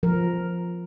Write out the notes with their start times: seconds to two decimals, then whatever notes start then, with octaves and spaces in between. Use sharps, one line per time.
0.03 F3 A#4